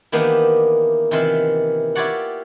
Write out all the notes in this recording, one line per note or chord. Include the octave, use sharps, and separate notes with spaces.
D#3 E3 A#3 B3 D4 G4
C3 D#3 E3 F4 E5
E4 F4 G4 C#5 D5 F#5